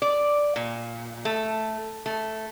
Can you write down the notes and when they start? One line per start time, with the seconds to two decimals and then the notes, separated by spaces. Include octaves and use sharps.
0.02 D5
0.56 A#2
1.25 A3
2.06 A3